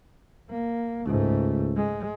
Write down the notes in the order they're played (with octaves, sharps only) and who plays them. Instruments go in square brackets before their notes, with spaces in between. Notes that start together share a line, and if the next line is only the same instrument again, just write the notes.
[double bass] A#3
[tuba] C#2 [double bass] G#2 A3
[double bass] G#3